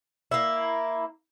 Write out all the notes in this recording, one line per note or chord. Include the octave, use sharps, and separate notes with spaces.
A#3 E4